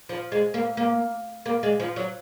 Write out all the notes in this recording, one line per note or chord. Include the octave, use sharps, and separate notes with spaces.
F3
G#3
A#3
A#3
A#3
G#3
F3
F#3